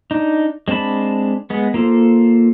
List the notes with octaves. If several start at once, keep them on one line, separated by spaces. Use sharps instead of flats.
D4 D#4
G#3 C4 D4 A5 B5
G#3 B3
A#3 F4 A4 C5